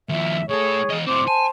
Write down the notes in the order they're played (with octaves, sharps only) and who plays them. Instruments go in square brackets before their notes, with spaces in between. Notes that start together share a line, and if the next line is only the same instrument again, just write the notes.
[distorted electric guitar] D#2 F3 [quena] E5
[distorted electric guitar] A2 A4 [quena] G#4 [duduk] C#5
[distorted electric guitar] E2 D#5
[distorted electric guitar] A2 C4 [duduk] C5 [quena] D6
[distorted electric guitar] G#5 [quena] A5